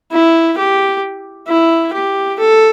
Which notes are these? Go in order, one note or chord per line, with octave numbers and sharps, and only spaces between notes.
E4
G4
E4
G4
A4